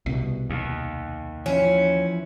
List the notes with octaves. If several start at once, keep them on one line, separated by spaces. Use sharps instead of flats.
C2 B2
D#2
E3 F3 C#4 E4